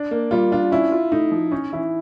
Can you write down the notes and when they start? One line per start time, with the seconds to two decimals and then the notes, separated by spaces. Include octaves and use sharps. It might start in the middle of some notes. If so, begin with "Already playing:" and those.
Already playing: D4
0.11 A#3
0.31 G3 F4
0.51 D4 F4
0.72 C#4 E4
0.92 F4
1.12 A3 D#4
1.32 F3
1.52 C#4 D#4
1.73 E3 E4